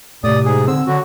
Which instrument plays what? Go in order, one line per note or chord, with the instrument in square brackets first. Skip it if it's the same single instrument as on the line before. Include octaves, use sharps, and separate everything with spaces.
[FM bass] A2 [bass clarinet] C3 [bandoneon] D5 D#6
[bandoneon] G#2 G#4
[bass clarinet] D3 [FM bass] C4 [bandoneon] E6
[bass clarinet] D3 [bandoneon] F#3 F#4